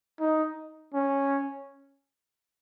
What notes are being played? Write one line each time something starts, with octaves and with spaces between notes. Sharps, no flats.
D#4
C#4